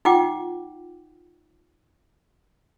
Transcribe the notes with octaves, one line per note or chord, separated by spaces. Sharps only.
D#4 F4 F#5 G5 D6